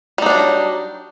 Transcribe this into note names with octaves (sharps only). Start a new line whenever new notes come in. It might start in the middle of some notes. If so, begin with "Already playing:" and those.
F#3 G3 D4 D#4